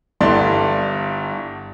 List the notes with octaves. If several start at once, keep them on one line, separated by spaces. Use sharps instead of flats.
G1 G2 E4 D5 C6